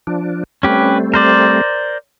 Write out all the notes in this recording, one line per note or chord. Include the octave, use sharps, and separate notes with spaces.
F3 D4
G3 A3 C4 C#4 G4 B4
A#4 C5 D5